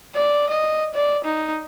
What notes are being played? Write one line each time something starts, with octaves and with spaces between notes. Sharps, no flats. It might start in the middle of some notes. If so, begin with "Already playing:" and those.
D5
D#5
D5
D#4